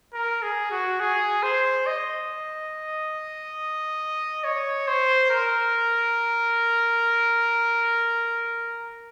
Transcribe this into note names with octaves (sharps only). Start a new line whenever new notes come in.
A#4
G#4
F#4
G#4
C5
D#5
C#5
C5
A#4